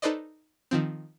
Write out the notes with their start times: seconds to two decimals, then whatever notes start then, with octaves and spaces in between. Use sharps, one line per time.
0.02 D#4 A4 B4 C5 D5 D#5
0.71 D#3 F3 C4